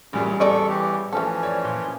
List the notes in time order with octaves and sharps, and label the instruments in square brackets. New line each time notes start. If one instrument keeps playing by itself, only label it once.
[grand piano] A1 G3 G#4 [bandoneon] F#2 A#2 C#4
[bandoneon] E2 A4 C#6 [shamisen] C5 D5 D#5
[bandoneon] E3 G4
[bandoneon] E3 F3 C#4 [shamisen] A3 A4
[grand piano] C#5 D5
A#2